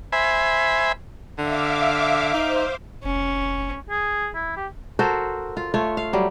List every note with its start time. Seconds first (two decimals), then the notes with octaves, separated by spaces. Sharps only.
0.12 C5 E5 G#5 B5
1.38 D3 E5 F5 D6
2.34 D#4 C5
3.04 F1 C#4
3.91 G#4
4.35 E4
4.57 G4
4.99 F#4 A4 A#4 C5
5.57 F4
5.74 A3 F4 C#5
5.97 F5
6.13 F#3 G3